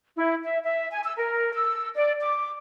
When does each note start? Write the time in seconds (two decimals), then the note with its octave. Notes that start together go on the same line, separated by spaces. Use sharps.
0.17 E4
0.44 E5
0.65 E5
0.92 G#5
1.04 E6
1.18 A#4
1.52 E6
1.96 D5
2.21 D6